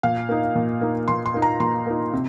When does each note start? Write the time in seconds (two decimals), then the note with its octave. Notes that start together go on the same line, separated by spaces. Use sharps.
0.03 A#2 F5
0.29 A#3 D#4
0.55 A#2
0.81 A#3 D#4
1.08 A#2 C6
1.26 C6
1.34 A#3 D#4
1.42 A#5
1.60 A#2 C6
1.86 A#3 D#4
2.13 C3